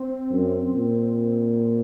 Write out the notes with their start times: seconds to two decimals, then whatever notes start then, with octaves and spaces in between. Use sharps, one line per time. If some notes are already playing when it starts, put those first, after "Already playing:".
Already playing: C4
0.31 F#2
0.74 A#2